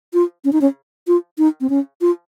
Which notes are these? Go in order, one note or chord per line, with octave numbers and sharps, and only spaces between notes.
F4
C#4
D#4
C#4
F4
D#4
C4
C#4
F4